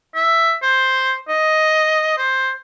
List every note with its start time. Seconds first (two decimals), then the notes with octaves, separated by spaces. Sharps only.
0.15 E5
0.62 C5
1.28 D#5
2.17 C5